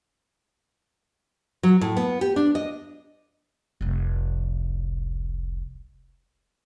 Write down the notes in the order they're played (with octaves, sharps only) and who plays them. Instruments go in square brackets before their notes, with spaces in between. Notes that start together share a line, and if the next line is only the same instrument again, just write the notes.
[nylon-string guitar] F#3
A2
B3
G4
D4
D#5
[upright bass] F1 C2